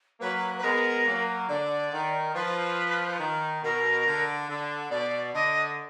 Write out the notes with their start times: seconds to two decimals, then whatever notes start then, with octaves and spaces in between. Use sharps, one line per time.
0.20 F#3 A#3 B4
0.58 B4
0.63 G#3 B3 A#4
1.06 F#3 A#3
1.49 D3 D5
1.92 D#3
2.34 F3 B4
3.19 D#3
3.62 B2 A#4
4.06 D3
4.48 D3
4.90 B2 D5
5.33 D3 D#5